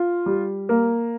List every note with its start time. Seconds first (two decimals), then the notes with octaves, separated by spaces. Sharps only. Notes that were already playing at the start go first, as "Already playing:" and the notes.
Already playing: F4
0.26 G3
0.69 A#3